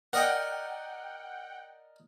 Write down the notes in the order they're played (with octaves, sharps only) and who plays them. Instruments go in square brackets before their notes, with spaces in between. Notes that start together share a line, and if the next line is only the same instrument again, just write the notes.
[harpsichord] A#4 D5 D#5 [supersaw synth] F#5 G5